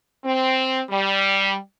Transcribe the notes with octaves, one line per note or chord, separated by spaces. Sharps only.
C4
G3